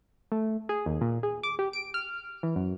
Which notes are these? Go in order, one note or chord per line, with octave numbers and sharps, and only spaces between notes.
A3
G#4
D#2
A#2
G#4
D6
G4
D7
F6
E3
F#2